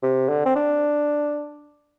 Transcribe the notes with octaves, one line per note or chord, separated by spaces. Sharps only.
C3
D3
C4
D4